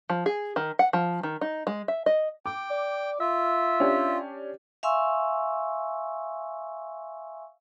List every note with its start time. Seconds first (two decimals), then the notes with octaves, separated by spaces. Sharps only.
0.10 F3
0.26 G#4
0.56 D#3
0.79 F#5
0.93 F3
1.23 D#3
1.41 D#4
1.67 G#3
1.88 E5
2.06 D#5
2.46 G5 D6
2.71 D5
3.20 F4 E5
3.80 C#4 D4 G4
4.83 E5 F5 G#5 C6 C#6 E6